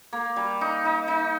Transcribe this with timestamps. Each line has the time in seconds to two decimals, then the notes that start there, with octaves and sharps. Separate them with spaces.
0.13 A#3
0.36 G3
0.61 D#4
0.85 D#4
1.08 D#4